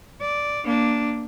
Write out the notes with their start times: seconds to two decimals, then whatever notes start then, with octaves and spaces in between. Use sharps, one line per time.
0.21 D5
0.65 A#3 D4